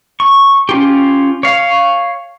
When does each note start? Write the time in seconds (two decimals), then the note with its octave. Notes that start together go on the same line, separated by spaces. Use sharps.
0.20 C#6
0.69 C#4 F4 G4
1.43 C#5 F5